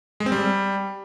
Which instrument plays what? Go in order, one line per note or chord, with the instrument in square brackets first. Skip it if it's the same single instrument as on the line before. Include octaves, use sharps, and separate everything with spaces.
[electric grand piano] G#3
C4
G3